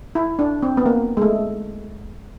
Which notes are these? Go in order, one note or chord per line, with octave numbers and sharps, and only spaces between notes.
E4
D4
C4
B3
A#3
G#3
A3